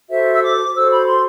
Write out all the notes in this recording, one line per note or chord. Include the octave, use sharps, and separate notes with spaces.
F#4 A4 C5 E5
E6
D6
F#4 A4 C5 E6
B5
C6